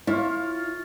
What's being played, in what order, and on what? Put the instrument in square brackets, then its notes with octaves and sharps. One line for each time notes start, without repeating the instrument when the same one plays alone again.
[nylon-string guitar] E4 [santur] F4 C#5 F5